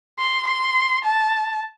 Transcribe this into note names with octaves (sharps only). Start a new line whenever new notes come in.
C6
C6
A5